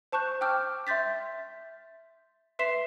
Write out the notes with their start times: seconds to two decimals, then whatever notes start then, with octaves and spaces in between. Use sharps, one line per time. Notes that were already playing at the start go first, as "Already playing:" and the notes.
0.12 C5 A5 C#6 F#6 G6
0.41 G5 D6 E6 F6 G6
0.87 E5 C6 G6 A6 B6
2.59 B4 E5 C6 B6 C7 E7